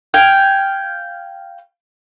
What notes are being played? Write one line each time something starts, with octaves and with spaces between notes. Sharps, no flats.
F5 G5 G#5